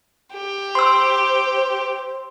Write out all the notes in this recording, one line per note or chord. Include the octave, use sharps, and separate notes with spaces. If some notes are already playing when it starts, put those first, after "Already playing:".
G4
C5 C6 E6